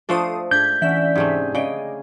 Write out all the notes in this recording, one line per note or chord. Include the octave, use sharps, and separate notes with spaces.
F3 A3 D4 A4 C5 D#6
G#2 D4 G6 G#6 B6
D3 E3 C#4 E5 B6
G#2 C3 A3 G#4
C#3 D5 D#5 G5